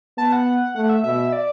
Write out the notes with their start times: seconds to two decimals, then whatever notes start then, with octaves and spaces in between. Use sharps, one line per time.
0.18 B3 A5
0.32 F#5
0.76 A3 F#5
0.89 E5
1.04 B2 E5
1.33 D5